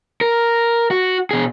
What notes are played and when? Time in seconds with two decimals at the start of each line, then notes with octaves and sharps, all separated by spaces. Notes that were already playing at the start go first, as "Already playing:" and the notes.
0.21 A#4
0.91 F#4
1.31 B2 G#4